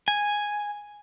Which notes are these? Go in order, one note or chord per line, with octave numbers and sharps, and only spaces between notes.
G#5